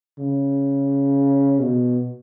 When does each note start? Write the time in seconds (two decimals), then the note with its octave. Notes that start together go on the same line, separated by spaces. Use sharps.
0.18 C#3
1.60 B2